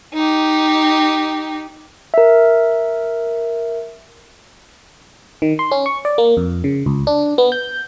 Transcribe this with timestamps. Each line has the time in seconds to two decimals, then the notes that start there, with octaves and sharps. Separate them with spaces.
0.14 D#4 G4
2.14 A#4 E5
5.42 D#3
5.59 C6
5.72 C#4
5.86 C#6
6.05 D5
6.18 A#3
6.37 F2
6.64 C#3
6.86 C#2
7.07 D4
7.38 B3
7.52 G6